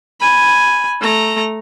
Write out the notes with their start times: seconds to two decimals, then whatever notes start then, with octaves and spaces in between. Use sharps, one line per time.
0.20 G#5 B5
1.00 A3 A#5